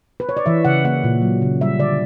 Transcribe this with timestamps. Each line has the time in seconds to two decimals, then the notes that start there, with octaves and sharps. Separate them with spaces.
0.20 B4
0.29 C#5
0.37 D5
0.46 E3 E5
0.65 C#3 F#5
0.85 A#3 F#5
1.04 A#2
1.22 F#3
1.42 C#3
1.61 G3 E5
1.79 D3 D5